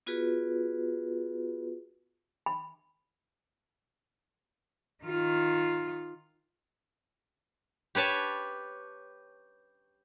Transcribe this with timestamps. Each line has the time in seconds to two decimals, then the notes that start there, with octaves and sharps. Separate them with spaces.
0.06 B3 F4 F#4 G#4 B4
2.46 B5
5.04 D#3 F4
7.95 G4 B4 C#5 A5